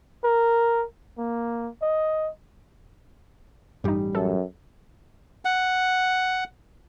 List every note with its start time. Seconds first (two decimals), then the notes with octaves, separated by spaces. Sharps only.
0.24 A#4
1.18 A#3
1.83 D#5
3.84 A1 G2 G3 D#4
4.15 F#2 A4
5.45 F#5